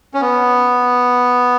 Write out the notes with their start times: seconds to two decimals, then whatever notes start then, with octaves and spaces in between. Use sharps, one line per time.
0.14 C#4
0.21 B3